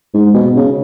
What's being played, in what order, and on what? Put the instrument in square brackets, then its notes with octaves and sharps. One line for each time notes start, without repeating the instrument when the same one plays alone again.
[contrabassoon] G#2
B2
C#3